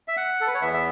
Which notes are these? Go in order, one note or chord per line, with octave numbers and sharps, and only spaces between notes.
E5
F#5
A4
B4
C#5
E2 E3 B3 E5
E5